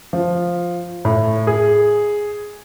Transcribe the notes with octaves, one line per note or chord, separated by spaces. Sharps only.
F3
A2
G#4